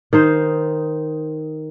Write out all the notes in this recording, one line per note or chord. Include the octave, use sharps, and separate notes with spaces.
D#3 D#4 C5